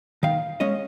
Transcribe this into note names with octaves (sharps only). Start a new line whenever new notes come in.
D#3 F5
G#3 C#4 D#5